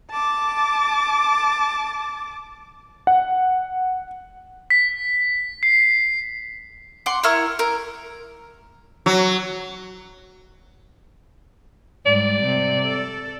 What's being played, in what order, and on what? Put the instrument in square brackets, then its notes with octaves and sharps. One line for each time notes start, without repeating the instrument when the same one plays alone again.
[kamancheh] A5 D6
[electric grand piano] F#5
[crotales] B6
C7
[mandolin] F#5 C6 D6
E4 A#4 C#6 F6
A#4
[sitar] F#3
[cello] G#2 G3 [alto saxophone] D5
[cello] C3
A4